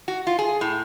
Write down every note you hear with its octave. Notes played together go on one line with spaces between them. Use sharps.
F#4
F4
G#4
A2